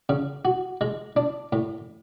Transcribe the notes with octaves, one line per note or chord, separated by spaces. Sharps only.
C#3
F#4
G#3
D4
A2